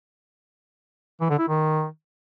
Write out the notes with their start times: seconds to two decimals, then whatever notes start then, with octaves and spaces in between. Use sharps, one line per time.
1.20 E3
1.30 D3
1.39 E4
1.48 D#3